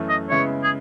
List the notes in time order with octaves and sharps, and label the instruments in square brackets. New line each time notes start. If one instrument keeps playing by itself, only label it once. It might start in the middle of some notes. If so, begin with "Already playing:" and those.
Already playing: [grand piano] F#2 E3 A3
[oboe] D#5
[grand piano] C#3 G#3 B3 E4 [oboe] C#5
[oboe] G#4